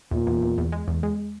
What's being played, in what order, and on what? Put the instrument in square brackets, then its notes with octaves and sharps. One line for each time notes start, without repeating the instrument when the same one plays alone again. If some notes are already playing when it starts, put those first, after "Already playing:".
[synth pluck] E2 [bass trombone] A#2
[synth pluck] E2
E2
E2
G#3
E2
G#3